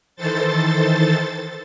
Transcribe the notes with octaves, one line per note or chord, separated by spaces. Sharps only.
D#3 E3 A4 C5 A6